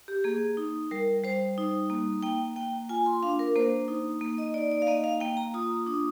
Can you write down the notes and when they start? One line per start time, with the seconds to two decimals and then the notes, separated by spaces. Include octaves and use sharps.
0.08 G4
0.24 A#3 G#4
0.57 D#4
0.91 G3 A#4
1.24 G3 C5
1.58 D#4
1.90 A#3
2.23 A#3 G5
2.56 A#3 G5
2.89 F4 G#5
3.06 C6
3.23 D4 F5
3.39 A#4
3.55 A#3 C5
3.88 D#4
4.21 A#3
4.38 D#5
4.54 D#4 D5
4.71 D5
4.82 F5
4.87 A#3 D#5
5.04 F5
5.20 A#3 G5
5.37 A#5
5.54 F4 D#6
5.86 D4 D#6